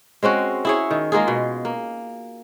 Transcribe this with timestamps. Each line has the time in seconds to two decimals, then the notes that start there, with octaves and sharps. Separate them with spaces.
0.23 G#3 C4 C#4 F#4
0.65 E4 G#4 C#5
0.91 D#3
1.12 G#3 A#3 F4 G#4
1.28 B2
1.65 A#3